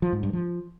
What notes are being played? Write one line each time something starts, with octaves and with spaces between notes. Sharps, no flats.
F3
G#2
G2
F3